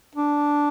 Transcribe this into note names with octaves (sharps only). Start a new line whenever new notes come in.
D4